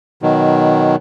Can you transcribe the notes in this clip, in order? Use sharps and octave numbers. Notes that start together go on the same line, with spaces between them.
B2 D#3 F#3